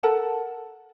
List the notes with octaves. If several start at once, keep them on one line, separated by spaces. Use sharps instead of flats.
A4 A#4 F#5 A5